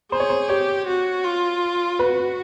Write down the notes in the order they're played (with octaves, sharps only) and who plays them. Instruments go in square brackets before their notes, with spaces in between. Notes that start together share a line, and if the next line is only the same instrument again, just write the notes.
[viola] G#4 [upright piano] C5
[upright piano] C#5
C5
[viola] G4 [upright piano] C#5
[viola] F#4
F4
[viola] F#4 [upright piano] B4